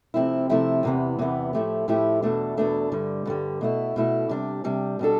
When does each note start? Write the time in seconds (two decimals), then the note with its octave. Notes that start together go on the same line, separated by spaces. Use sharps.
0.14 C3 F3 A3 C4 E4
0.49 C3 F3 A3 C4 E4
0.83 E2 C3 E3 B3
1.19 E2 C3 E3 B3
1.53 A2 F3 A3 E4 G4
1.88 A2 F3 A3 E4 G4
2.22 E2 B2 A3 D4
2.57 E2 B2 A3 D4
2.92 G2 D3 G3
3.26 G2 D3 G3
3.61 B2 A3 E4
3.96 B2 A3 E4
4.29 C3 G3 D4
4.64 C3 G3 D4
4.99 B2 G3 D4 A4